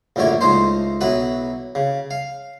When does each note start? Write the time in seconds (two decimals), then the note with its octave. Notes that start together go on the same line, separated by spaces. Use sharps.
0.16 A#1 F#2 A2 D3 E4 C#5
0.41 C#2 A3 D#4 C5 C6
1.01 B1 F#3 E4 B4 B5
1.75 C#3
2.11 F5